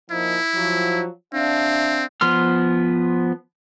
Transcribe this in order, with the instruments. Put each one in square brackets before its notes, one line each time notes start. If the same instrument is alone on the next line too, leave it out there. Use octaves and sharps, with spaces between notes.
[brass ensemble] A#2 F3 D#4 [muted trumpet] E4
[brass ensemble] F3 F#3
[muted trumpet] C4 [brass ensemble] D4 E5 F5
[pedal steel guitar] F3 B3 C6 F6